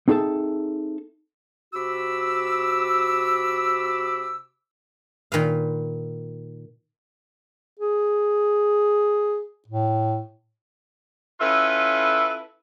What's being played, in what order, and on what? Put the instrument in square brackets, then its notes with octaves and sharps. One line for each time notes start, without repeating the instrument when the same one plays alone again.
[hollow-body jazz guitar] C4 D#4 G#4 A4 E5 A5
[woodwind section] C3 F#4 B5 D6 E6
[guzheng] A#2 D#3 B4 F5
[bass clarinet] G#4
A2
[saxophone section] C#4 E4 F4 A4 B4